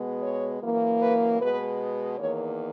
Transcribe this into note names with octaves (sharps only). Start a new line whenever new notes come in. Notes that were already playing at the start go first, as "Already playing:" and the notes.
Already playing: B2 G#3 B3
C#5
F#2 E3 A#3
B4
B2 G#3 B3 B4
E2 D#3 A#3 C#5